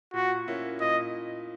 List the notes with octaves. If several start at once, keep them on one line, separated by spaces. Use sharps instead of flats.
A#2 F#4
A#3 C#4 E4
A#2 D#5